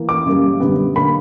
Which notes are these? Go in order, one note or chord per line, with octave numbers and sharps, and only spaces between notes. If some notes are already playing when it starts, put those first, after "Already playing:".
Already playing: E3 A#3
D6
F#2 C#3 G3 A#3
F#2 D3 G3 B3
D3 A#3 B5